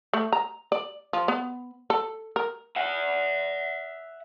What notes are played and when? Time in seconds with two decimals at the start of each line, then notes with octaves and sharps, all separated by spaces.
0.13 A3
0.32 A#5
0.72 D5
1.13 F3
1.28 B3
1.90 A4
2.36 A#4
2.76 E5 F#5